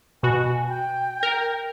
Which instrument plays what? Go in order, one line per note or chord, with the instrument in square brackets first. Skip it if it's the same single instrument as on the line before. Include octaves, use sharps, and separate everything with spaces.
[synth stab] B2 F#4 [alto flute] G#5
[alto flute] G5
[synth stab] A#4